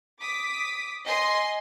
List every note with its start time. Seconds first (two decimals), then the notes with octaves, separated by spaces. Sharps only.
0.21 D6 D#6 B6
1.07 D#5 G#5 C6 C7